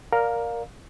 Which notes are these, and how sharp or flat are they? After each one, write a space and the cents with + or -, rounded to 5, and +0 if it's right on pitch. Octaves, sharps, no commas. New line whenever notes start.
A#4 +0 D5 +0 F5 +15